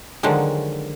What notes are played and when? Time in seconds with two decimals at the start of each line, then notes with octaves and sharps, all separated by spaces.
0.23 D3 D#3 F3 F#3 G#3 D4